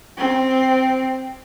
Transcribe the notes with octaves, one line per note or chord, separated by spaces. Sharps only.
C4